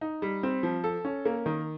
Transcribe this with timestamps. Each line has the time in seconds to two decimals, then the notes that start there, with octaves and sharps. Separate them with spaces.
0.01 D#4
0.22 G3
0.43 C4
0.63 F3
0.84 A4
1.05 C#4
1.25 A#3
1.46 D#3